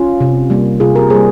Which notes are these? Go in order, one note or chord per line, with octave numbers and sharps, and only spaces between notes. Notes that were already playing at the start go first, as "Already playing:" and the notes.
Already playing: C#4 F4
C3
G3 A#3
C3 F4 G#4
G4 A#4
G3 A#3 G#4 C5